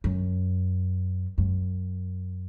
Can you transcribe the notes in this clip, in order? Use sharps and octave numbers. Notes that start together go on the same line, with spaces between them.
F#2
F#2